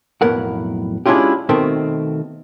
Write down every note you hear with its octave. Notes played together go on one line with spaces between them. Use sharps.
B1 F2 A2 B3 A#4 F#5
G#3 C#4 D4 E4 F4 G4
B2 D#3 A3 C4